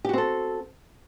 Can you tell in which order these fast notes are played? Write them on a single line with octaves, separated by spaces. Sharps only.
G4 F#4 C4 A4